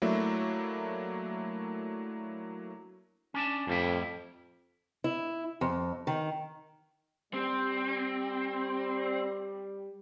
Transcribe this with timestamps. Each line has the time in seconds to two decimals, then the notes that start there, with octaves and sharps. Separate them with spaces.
0.02 F#3 A3 A#3 D4 E4
3.34 C#4 D4 A5
3.67 F2 A2 G3 E4
5.04 E4
5.61 F2
6.07 D#3
7.34 G3 C4